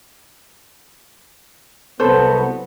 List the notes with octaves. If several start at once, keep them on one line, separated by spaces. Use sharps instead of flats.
C2 F#3 B3 A4 C5